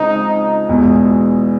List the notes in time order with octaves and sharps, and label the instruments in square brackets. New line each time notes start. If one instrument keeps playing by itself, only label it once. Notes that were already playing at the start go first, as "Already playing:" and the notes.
Already playing: [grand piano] C#3 F3 G#3 C4 [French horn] D#4
[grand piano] E2 B2 G#3